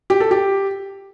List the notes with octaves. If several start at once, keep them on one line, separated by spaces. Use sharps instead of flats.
G4
A4
G4